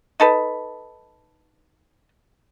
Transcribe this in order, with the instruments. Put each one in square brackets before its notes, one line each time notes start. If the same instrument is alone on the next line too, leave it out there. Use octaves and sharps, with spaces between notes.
[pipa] D#4 A4 B4